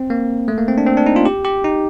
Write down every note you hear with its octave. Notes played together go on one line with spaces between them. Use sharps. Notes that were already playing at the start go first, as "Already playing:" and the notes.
Already playing: C4
A#3
A3
A#3
C4
D4
C4
D4
D#4
F4
G4
G4
D#4